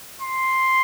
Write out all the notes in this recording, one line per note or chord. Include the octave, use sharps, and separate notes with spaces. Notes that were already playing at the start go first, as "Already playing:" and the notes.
C6